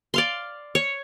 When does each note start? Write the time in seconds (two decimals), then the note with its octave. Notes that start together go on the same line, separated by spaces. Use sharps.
0.14 D5 F5 C6
0.75 C#5